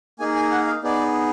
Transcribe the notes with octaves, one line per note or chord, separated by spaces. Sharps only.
A#3 D#4 G#4 G#5
G#5
F#5
F5
B3 D#4 G#4 D5